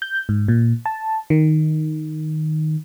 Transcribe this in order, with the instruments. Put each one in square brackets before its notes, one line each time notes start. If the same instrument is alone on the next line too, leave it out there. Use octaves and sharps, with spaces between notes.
[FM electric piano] G6
G#2
A#2
A5
D#3